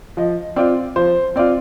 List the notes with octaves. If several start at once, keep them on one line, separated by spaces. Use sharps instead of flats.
F3 D#5
C4 F4 D5
F3 C5
C4 F4 D5